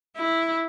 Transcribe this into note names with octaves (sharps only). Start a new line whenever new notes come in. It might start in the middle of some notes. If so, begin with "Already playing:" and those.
E4